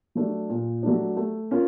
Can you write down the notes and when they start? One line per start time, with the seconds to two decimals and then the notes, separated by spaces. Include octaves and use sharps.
0.15 F#3 A3 D4
0.49 A#2
0.83 F#3 A3 D4
1.17 A3
1.51 C#4 F4 A#4